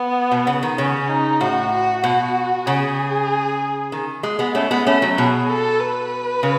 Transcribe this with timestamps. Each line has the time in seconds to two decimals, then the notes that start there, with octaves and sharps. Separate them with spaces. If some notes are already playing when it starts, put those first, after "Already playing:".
Already playing: B3
0.31 B2
0.47 C#3
0.63 D#3
0.78 C#3 C#4
1.09 D#4
1.41 A2 F#4
1.72 F#4
2.04 B2 F#4
2.66 C#3 G#4
3.92 D#3
4.23 G#3
4.39 G#3 B3
4.55 A3 C#4
4.71 G#3 B3
4.87 A3 C#4
5.02 F#3
5.17 B2 G#4
5.50 A4
5.80 B4
6.43 C#3